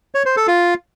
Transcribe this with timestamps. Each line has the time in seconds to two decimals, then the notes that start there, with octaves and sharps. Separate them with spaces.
0.15 C#5
0.26 C5
0.36 A4
0.47 F4